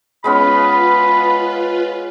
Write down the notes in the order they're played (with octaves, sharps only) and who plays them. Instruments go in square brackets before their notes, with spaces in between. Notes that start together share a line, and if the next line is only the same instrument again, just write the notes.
[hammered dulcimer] G#3 B3 C#4 [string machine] F4 B4 [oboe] B5